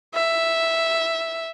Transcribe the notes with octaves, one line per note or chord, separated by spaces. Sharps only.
E5